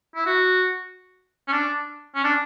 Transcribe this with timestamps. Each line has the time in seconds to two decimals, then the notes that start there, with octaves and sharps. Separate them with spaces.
0.16 E4
0.26 F#4
1.48 C#4
1.52 D4
2.15 C#4
2.24 D4